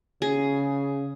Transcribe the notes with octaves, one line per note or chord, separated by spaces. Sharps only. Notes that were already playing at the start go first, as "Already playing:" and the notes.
C#3 G#4